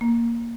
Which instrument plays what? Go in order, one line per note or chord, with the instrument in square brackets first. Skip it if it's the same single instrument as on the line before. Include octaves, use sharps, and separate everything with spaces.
[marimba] A#3